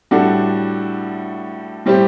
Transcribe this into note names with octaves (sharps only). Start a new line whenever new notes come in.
A2 G3 D4 F#4 A4
A2 G3 C4 G4